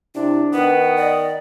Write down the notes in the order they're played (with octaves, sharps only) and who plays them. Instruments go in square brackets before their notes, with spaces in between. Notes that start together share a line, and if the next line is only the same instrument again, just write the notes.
[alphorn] C3 [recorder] D4 [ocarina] E4
[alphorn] D#3 [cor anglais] B3 [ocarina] B4
[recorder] D5 [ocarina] D#5